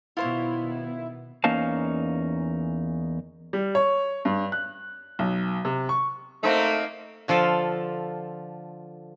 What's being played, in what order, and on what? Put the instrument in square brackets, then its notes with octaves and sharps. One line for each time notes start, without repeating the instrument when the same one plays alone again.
[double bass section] B2 D#3 B3 [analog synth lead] E4 [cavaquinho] F4 C5 C#5
[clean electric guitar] E2 A#3 C#4 D#4 F5 A5
[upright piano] G3
C#5
G2
F#6
B1
C3
C#6
[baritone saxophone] A3 [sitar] A#3 C4 D#4
[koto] D3 F3 F4 A4